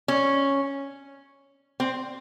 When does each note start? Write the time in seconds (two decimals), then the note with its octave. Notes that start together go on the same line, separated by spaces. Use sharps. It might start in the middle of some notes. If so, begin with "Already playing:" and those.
0.08 C#4
1.80 C4